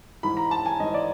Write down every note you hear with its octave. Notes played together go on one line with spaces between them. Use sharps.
G#2 E3 B5
A#5
A5
G#5
G#2 E3 D#5
D5